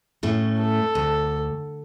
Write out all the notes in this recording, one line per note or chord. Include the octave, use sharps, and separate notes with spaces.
A2 A3 C#4
A4
D2